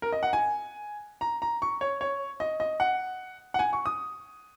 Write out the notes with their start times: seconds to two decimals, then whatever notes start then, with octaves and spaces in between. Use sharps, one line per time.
0.02 A#4
0.12 D#5
0.23 F#5
0.33 G#5
1.21 A#5
1.42 A#5
1.62 C#6
1.81 C#5
2.01 C#5
2.40 D#5
2.60 D#5
2.80 F#5
3.54 F#5
3.59 G#5
3.73 C#6
3.86 D#6